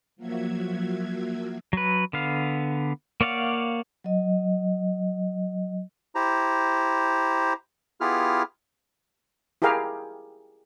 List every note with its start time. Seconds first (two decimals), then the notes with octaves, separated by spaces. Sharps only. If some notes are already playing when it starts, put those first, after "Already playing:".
0.16 F3 F#3 A#3 F#4 E5 G#6
1.73 F#3 B4
2.13 D3 B3 F5
3.21 A#3 C#5 D5 F5 F#5
4.04 F#3 D#5
6.15 E4 G4 C5 A#5
8.01 B3 E4 F4 G4 G#4 F6
9.62 E4 G4 G#4 A#4 F5